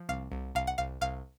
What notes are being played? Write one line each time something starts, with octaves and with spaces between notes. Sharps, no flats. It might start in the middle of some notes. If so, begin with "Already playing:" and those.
Already playing: F3
C2 F5
C2
C2 F5
F#5
C2 F5
C2 F5